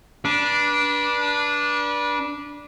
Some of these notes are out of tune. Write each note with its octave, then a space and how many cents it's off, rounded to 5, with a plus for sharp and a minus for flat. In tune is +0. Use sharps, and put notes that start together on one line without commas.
D4 -5 B4 -30